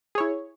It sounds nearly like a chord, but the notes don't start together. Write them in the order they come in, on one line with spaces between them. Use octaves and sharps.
G#4 C#5 E4